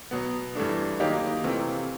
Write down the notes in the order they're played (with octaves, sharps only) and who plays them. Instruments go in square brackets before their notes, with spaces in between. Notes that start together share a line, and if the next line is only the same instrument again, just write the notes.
[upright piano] B2 F#3 B3
G2 E3 A3 D4
D#3 F#3 A#3 D#4 G4
C3 E3 A3 C4 F4